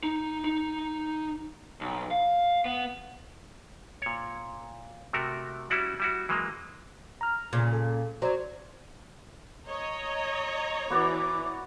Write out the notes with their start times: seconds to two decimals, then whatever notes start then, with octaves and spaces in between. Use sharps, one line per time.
0.03 D#4
0.45 D#4
1.81 B1
2.11 F5
2.65 B3
4.02 A#2 C#5
5.13 C3 A3 F#4 A#4
5.70 G3 C#4 E4 F#4 D5
6.00 G3 E4 F#4
6.29 E3 F#3 G#3 A#3
7.21 A#5 F6
7.53 A#2 C#3
7.73 A4
8.22 F#3 C5 D5
9.67 C#5 D#5 A#5
10.90 E3 B3 F#4 D5 D6